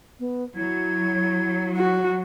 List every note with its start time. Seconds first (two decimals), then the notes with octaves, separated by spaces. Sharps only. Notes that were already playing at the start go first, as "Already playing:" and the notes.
0.20 B3
0.56 F#3 E4 G#6
1.76 F#4